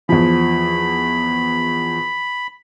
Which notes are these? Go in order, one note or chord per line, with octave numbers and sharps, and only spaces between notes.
E2 F3 B5